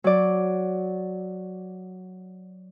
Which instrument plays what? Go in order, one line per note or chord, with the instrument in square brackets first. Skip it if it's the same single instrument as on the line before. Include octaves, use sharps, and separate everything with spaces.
[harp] F#3 D5